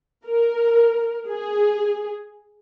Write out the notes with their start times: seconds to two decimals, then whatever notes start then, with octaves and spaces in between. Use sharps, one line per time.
0.24 A#4
1.28 G#4